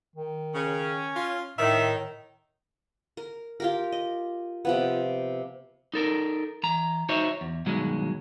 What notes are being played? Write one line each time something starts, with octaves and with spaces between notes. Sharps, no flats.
D#3
C#3 C#4
F4
A2 D#3 E5
A#4
F4 G4 A#4
D#5
C3 F3 B3
D#4 A4 A#4
E3 A#5
D#4 F#4 C5 C#5 D#5 E5
E2
G2 B2 D#3 F#3 G#3